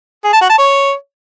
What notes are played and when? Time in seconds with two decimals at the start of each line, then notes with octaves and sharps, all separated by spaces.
0.24 G#4
0.33 A5
0.41 F#4
0.50 A5
0.58 C#5